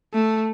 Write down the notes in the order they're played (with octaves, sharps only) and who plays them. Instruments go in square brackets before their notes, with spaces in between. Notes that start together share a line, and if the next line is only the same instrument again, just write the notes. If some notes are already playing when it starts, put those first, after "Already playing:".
[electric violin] A3